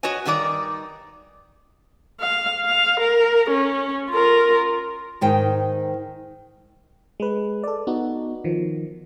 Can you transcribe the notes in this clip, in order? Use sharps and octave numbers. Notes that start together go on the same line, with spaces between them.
F#4 B4 C#5 D#5 G#5
G2 D#3 D#4 G4 D5
F5
F5
A#4
C#4
F4 A#4
G#2 D#3 G5
G#3 B4
A4 D5
B3 D#4 F#4
D#3 F3